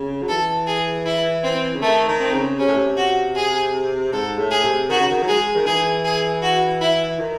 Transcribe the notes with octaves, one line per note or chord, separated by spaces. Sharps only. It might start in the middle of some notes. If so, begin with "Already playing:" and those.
Already playing: C#3
F#3
E3 A4
G#4
E4
C4
C#3
D#3 A3
D#3
C4
C#3
C3 C#4
A2
C3
F#4
G#4
G#2 A4
A2
G#4
C3
D#3 F#4
C#3
D#3
F#3
G#3 G#4
D#3
E3 G#4
G#4
F#4
E4
D#3